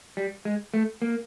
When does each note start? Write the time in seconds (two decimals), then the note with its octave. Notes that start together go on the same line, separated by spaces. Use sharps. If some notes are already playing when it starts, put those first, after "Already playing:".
0.17 G3
0.45 G#3
0.74 A3
1.02 A#3